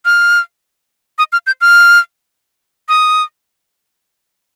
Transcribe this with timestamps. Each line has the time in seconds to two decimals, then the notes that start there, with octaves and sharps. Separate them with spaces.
0.05 F6
1.18 D#6
1.33 F6
1.47 G6
1.61 F6
2.89 D#6